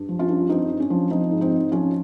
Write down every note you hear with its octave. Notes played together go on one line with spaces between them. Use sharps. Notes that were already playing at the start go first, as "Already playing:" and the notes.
Already playing: G2
F3
C#4 F4
G2
G2 C4 D#4
G2
C#4
F3
F3 C4 D#4
G#2
C4 D#4
G#2
F3 C#4 F4